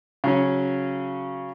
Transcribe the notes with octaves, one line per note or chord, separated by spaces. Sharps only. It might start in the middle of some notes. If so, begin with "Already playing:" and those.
C#3 F#3 C#4